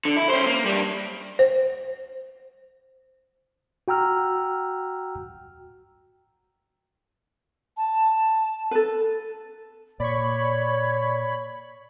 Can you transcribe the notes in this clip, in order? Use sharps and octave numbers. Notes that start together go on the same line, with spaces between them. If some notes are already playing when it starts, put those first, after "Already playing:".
D3
E4
C#4 C5
A#3
G2 G3
C5
F#4 G5 A#5 E6 F6
A5
A4 B4
A#2 C#5 D5 B5 C#6